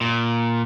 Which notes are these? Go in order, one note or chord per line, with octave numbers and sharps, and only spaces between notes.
A#2